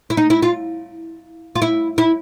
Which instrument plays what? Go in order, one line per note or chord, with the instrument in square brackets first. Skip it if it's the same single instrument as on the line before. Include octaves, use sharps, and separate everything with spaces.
[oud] E4
D#4
E4
F4
F4
E4
E4